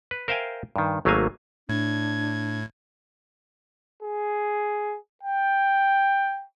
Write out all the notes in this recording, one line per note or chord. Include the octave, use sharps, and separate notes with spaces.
B4
A#4 C5 E5 F5 G5 G#5
G2 D#3
G#1 F#3 A3 A#3 F5 G#5
A2 D4 G#6
G#4
G5